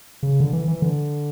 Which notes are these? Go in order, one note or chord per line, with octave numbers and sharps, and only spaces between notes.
C#3
D3
E3
E3
D3